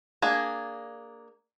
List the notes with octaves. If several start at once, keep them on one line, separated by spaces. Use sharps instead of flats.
A#3 D4 G#4